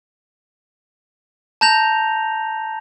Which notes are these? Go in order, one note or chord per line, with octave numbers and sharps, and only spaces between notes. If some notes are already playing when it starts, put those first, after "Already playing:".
A5 A#5 G6 A#6 F7